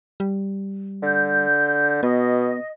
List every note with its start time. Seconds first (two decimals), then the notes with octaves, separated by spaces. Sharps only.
0.20 G3
1.03 D3 G6
2.03 B2 B3 D#5